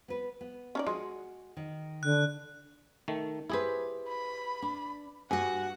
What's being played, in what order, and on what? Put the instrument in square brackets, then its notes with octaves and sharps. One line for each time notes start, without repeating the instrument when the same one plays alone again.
[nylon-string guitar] B3 B4
B3
[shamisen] C#4 D#4 D5
[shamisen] G#3 [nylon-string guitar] F#4 G#4
[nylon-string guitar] D#3
[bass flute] D3 [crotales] F#6
[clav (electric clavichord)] D#3 A3
[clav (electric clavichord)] E4 G#4 C5 [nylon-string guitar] G4 B4
[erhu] B5
[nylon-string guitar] D4
[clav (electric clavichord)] G2 [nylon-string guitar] F#4 G#5 [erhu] F#5